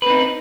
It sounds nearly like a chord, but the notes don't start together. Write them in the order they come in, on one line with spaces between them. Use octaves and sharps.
B4 C4 D#4